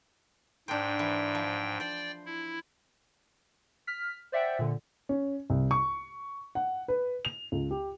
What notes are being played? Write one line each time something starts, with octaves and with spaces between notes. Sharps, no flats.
G#2 D4 C5 G5
E3
F3
C5 D5 G5
E4
F6 B6
C5 D5 E5 F#5 G5
A#2 D3
C#4
C2
C#6
F#5
B4
F7
C#2
G4